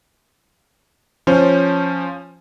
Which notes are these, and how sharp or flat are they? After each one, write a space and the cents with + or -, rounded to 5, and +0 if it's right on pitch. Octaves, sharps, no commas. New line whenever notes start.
F3 +0 C#4 -10 C5 +0